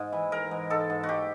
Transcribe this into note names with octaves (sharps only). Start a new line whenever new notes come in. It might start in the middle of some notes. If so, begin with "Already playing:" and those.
Already playing: G#2
E3
E3 A#4
G#2
G#2 A4
G#2
F#4
G#2 G4